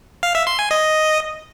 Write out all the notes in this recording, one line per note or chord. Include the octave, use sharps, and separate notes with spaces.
F5
E5
C6
G#5
D#5